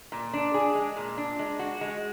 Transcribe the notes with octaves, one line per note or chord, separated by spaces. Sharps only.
A#2
D4
G#4
G#3
A#2
D4
G#3
F#4
G#3